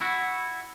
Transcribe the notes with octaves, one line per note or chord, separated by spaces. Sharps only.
E4 F#4